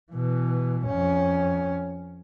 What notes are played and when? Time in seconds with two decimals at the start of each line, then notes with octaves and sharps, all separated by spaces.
0.12 B2 E3
0.86 F2 C#4